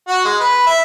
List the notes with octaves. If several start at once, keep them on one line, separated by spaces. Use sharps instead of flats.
F#4
G#3
B4
E5